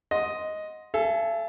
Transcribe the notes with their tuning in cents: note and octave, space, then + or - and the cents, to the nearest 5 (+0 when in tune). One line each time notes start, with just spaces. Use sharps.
D#5 +5 F#5 -20 C6 +0
A4 -5 E5 +45 G#5 +20